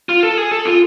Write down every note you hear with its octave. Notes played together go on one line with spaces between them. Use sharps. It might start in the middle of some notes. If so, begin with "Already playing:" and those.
F4
A4
G#4
A4
F4